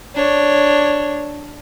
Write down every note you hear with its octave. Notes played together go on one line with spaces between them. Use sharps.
D4 C#5